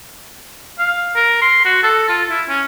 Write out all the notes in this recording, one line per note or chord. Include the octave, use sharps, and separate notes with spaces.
F5
A#4
C6
F#4
A4
F4
E4
C#4